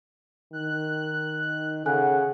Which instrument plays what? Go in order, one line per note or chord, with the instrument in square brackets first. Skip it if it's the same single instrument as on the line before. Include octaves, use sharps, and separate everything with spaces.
[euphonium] D#3 [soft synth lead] F#6
[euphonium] C#3 [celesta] A4 G#5 F#6 [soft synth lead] F#5